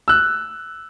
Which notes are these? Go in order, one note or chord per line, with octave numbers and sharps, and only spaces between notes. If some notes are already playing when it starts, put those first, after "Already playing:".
E6 F#6